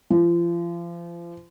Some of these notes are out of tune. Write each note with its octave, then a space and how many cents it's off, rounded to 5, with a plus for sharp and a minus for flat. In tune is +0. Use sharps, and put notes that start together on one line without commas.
F3 -35